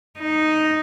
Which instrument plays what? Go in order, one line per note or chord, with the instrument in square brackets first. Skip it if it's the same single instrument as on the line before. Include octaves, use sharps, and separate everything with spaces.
[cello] D#4